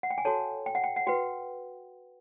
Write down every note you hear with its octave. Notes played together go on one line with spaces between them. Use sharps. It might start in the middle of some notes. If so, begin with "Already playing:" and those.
F#5
G5
G#5
F#4 A4 C#5 A5
G5
F#5
G5
F#5
F#4 B4 G5